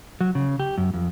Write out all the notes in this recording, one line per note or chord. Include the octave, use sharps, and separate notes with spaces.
F#3
C#3
G4
F#2
F2